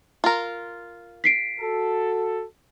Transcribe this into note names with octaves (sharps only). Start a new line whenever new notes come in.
F4 A#4
B6 C7 D7
F#4 A4